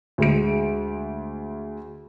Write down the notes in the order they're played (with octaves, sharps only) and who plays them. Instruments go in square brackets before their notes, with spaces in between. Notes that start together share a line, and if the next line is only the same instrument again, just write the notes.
[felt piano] D2 G#3 D7